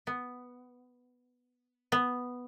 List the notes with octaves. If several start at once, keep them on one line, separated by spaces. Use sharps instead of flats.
B3
B3